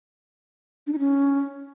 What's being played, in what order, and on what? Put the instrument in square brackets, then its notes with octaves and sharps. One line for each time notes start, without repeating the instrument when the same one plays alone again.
[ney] D4
D#4
C#4